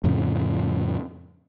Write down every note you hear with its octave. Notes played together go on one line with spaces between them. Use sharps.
F2 A2 C#3 F3